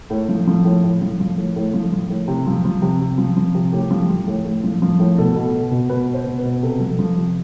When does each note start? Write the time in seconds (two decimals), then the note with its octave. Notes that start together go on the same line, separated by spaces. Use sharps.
0.10 A2
0.28 F3
0.47 F3
0.65 A2
0.84 A2
1.01 F3
1.20 F3
1.37 A2
1.56 A2
1.73 F3
1.92 F3
2.10 A2
2.28 C3
2.47 F3
2.65 F3
2.82 C3
3.01 C3
3.18 F3
3.37 F3
3.54 C3
3.72 A2 G4
3.91 F3
4.09 F3
4.27 A2
4.45 A2
4.63 F3
4.82 F3
4.99 A2
5.18 B2 A4
5.36 B2
5.54 B2
5.71 B2
5.89 B2 B4
6.08 B2
6.14 C5
6.26 B2
6.38 B4
6.44 B2
6.62 C3 A4
6.80 F3
6.99 F3
7.17 C3